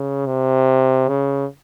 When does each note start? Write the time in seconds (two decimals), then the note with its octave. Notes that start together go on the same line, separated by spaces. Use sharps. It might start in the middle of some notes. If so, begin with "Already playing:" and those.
Already playing: C#3
0.26 C3
1.08 C#3